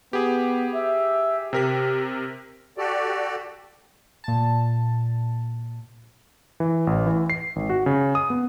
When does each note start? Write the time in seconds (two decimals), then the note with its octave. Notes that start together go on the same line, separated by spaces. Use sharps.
0.13 B3 G4 G#4
0.74 E5
1.53 C3 G4 A#4 B6
2.78 F#4 G4 A4 D5
4.24 A#2 A5
6.60 E3
6.87 A1
7.06 E3
7.30 C7
7.56 G#1
7.70 F#4
7.86 C#3
8.15 D#6
8.30 B3